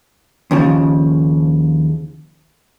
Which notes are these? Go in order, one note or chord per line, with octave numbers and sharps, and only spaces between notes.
D#2 C#3 F3